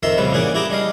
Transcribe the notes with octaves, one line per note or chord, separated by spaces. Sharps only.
F2 D#3 E5 A#5 C6
A#1 F2 C#3 G3 B4
A#2 C#3 E3 G#4 F#5 D6
E4 G4 G#4 A#5 D6
G3 D4 D#5 F5